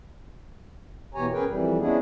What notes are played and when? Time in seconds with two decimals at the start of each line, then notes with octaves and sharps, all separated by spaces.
1.14 B2 E3 G4 C#5 G#5 A#5
1.33 F#2 G#4 A#4 B4 G5
1.47 F2 E3 G3
1.79 G#3 B3 C#4 D4 E4 G#4